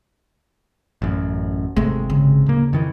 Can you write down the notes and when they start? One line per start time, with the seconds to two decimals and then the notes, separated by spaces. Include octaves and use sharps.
1.02 A1 F#2
1.76 G#1 C3 G#3 A3
2.10 C#3
2.46 D1 A#3
2.73 F2 D#3 E3